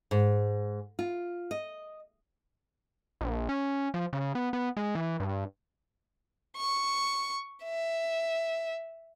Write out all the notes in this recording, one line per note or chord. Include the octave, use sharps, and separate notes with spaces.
G#2
F4
D#5
A#1
C#4
F3
C#3
B3
B3
G#3
E3
G2
C#6
E5